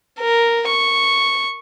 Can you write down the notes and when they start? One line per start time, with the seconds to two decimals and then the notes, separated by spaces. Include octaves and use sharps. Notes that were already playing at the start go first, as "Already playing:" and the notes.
0.20 A#4
0.68 C#6